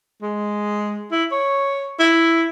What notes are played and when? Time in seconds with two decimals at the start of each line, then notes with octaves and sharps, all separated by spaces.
0.22 G#3
1.11 E4
1.32 C#5
1.99 E4